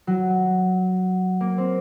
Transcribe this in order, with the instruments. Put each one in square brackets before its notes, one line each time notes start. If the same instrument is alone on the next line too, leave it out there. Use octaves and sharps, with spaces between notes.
[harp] F#3
A#3
C4